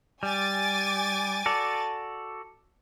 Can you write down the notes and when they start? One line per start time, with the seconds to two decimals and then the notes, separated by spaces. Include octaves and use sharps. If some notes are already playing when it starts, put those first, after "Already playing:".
0.23 G3 G#5 D6 A6
1.46 F#4 A4 D5